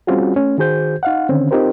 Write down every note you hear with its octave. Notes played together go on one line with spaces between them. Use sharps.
G3 C4 C#4 F4 F#4 G#4
A3 C#4
D#3 F#4 G#4 C5 G6
D#4 F5 F#5
D3 D#3 C4 C#4
C4 D#4 F4 G4 A#4 C5